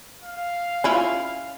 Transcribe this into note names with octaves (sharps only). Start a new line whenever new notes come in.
F5
C#4 E4 F4